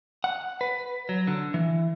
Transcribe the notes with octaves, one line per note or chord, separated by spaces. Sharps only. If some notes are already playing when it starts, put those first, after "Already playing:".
F#5
B4
F#3
D3
E3